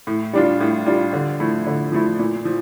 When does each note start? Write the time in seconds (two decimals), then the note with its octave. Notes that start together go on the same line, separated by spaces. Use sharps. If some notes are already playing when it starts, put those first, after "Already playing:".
0.07 A2
0.33 G3 D4 F4
0.60 A2
0.87 G3 D4 F4
1.13 D3
1.40 F3 A3 E4
1.67 D3
1.92 F3 A3 E4
2.19 A#2
2.45 F3